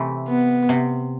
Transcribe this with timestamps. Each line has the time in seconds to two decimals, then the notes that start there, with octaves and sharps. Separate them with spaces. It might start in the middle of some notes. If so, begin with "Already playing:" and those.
Already playing: C3 E3 A3
0.28 B3
0.69 C3